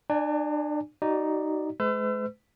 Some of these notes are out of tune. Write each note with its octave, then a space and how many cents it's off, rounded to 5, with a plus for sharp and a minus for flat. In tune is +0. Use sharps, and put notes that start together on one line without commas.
D4 +40 D5 -10 G#5 +0
D#4 +0 F#4 +40 D5 +10
G#3 +40 B4 +45 E6 +35